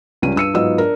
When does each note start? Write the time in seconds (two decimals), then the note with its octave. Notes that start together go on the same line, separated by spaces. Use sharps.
0.22 C#2 G3 C#4 D#7
0.36 G2 E6 C#7 D#7
0.54 G#2 F#3 B3 F4 D#5 E6
0.78 D4 A#4